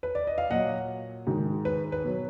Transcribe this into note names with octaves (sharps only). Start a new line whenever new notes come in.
B4
D5
D#5
F5
A#2 F#3 D#5 F#5
G#2 D#3 G#3
B4
B4
B2 F#3